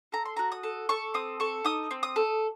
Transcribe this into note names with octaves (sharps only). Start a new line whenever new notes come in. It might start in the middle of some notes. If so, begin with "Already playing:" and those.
A4 A#5
C6
F#4 A#5
D#6
A4
A4 C#6
C4 D#6
A4 C#6
D#4 D#6
C4
D#6
A4